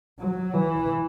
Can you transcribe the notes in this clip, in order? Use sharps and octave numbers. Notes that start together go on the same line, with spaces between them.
F#3
E3